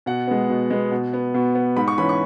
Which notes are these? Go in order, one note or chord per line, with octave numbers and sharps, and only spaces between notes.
B2 F#5
G#3 B3
B2
G#3 B3
B2
B3
B2
B3
G#2 B5
C#6
E3 C#4 B5
C#6